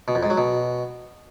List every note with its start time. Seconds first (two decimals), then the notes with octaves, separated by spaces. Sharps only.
0.08 B2
0.15 F2
0.23 G#2
0.30 F#3
0.37 B2